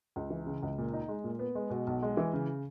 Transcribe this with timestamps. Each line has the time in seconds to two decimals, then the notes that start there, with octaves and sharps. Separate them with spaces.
0.16 C#2
0.30 E3
0.46 C#3
0.63 C#2
0.78 A#2
0.93 D#4
1.09 G#3
1.24 A#2
1.39 B3
1.55 G#3
1.70 B2
1.87 B1
2.03 G#3
2.17 E3
2.33 C#3